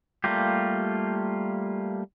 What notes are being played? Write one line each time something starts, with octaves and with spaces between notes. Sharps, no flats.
G3 A3 A#3 F4 G4